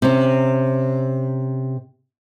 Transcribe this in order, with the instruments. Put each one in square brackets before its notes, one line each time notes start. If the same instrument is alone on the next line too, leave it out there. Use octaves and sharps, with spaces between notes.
[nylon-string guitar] C3 C#4